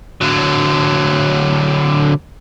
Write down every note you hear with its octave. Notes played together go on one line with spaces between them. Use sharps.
D3 F#3